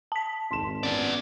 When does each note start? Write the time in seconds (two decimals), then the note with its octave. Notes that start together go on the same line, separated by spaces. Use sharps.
0.12 A5 B6
0.51 G#1 C6 E7
0.83 B3 C#4 D5